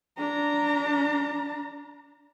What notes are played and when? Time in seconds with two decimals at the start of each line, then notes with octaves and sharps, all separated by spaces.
0.18 D4 A#5